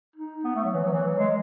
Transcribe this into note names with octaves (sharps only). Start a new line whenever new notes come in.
D#4
B3
A3
F#3
E3
F#3
E3
F#3
G#3